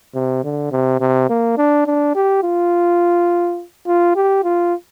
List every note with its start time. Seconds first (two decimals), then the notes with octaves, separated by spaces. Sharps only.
0.15 C3
0.44 D3
0.71 C3
1.01 C3
1.29 A#3
1.57 D4
1.86 D4
2.15 G4
2.43 F4
3.87 F4
4.16 G4
4.44 F4